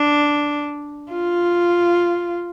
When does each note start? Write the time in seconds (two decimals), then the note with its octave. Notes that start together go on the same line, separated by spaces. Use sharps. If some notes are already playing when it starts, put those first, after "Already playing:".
Already playing: D4
1.13 F4